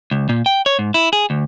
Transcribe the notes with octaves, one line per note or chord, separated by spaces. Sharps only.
C#2
A#2
G5
C#5
G#2
E4
G#4
D2